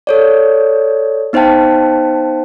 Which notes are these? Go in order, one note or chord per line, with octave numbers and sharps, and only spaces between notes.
A4 C#5 D5
B3 D#4 C5 F5 G5 A5